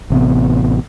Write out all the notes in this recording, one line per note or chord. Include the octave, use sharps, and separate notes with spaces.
A1 C3 B3